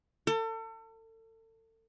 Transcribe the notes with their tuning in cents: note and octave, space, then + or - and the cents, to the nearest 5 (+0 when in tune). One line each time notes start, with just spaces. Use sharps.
A4 +35